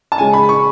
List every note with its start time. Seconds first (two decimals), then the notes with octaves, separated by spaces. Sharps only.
0.12 A5
0.18 C#3 G#3 C#4 G#5
0.33 B5
0.49 C#6